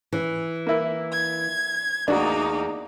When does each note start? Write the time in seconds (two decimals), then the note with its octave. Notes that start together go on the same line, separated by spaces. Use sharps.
0.13 E3
0.67 A#3 E4
1.12 G#6
2.08 E2 A3 A#3 D4 D#4 F#4